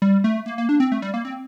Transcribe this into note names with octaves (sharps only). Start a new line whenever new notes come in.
G3
A3
A#3
A#3
D4
C4
A3
G3
A#3
C4